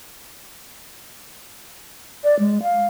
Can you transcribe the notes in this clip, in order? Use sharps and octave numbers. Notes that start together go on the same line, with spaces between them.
D5
G#3
F5